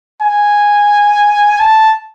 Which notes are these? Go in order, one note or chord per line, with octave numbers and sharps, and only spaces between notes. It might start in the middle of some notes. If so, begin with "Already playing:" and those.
G#5
A5